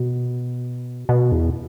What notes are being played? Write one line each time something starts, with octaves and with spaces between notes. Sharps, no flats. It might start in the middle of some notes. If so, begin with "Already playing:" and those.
Already playing: B2
B2
E2